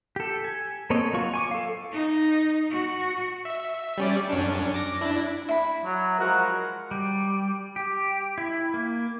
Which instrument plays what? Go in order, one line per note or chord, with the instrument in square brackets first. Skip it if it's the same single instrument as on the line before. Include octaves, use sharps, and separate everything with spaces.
[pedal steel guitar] G4 A4
G#5
A#3 C4 A4 C#5 D#5
F#3 F4 C#6
G#5 C#6 D6
A4 F5
[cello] D#4
F#4
[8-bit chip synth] E5
G3 C#4 D5
F#2 C#4 D4
D6 A#6
D4 E4
[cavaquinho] E4 B5
[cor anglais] F#3
[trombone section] F3 G#3 A#4 [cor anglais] F#4
[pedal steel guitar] G3
G4
E4
A#3